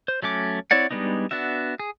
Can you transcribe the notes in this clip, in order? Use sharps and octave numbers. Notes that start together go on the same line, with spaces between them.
C5
F#3 A3 C#4 D6
C4 E4 C#5 D5 F#5
G3 G#3 B3 D4 D#4
B3 D4 F#4 E5
G#4